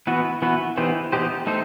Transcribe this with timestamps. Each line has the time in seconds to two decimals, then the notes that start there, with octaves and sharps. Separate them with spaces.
0.07 E3 B3 F#4 B4
0.42 E3 B3 F#4 B4
0.77 E3 B3 D#4 G4 C5
1.12 E3 B3 D#4 G4 C5
1.47 A3 D#4 A4 C5